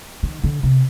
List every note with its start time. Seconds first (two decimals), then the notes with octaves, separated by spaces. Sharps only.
0.23 D#3
0.44 D3
0.63 C3